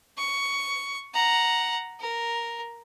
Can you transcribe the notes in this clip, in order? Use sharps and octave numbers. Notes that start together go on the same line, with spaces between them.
C#6
F#5 A#5
A#4